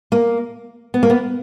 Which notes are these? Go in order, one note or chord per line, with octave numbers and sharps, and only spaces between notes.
A#3
B3
A#3
B3